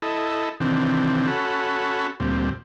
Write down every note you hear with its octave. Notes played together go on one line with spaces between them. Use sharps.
E4 A4 D#5
C3 D#3 E3 C4 D4
C#4 F#4 A4 B5
D2 A#2 G3 C4